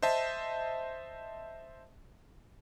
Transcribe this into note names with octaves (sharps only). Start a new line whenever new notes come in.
C5 D#5 E5 A5